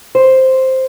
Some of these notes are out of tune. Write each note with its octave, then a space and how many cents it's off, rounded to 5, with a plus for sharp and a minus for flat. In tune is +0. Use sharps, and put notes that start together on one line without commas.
C5 +0